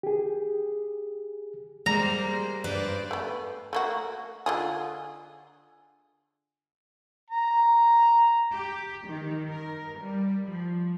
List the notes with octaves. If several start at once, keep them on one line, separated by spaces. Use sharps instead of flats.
G4 G#4
G3 G#3 A#3 C5 A#5
G2 B4 C5 D5
A3 B3
A3 A#3 F#4
D3 F4 G#4
A#5
G4
D#3
A#4
G3
F3